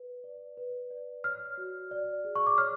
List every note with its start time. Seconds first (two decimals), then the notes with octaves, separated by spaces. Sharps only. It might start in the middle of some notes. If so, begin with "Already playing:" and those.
Already playing: B4
0.24 D5
0.57 B4
0.91 D5
1.24 C#5 F6
1.57 F#4
1.91 D5
2.25 G#4
2.36 C#6
2.47 D6
2.58 C#5 F6